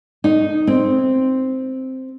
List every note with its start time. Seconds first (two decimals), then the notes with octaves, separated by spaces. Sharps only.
0.24 D#4
0.67 C4